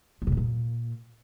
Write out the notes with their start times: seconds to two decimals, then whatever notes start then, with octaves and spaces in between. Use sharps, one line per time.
0.22 F#3
0.27 C3
0.32 F#2
0.37 A#2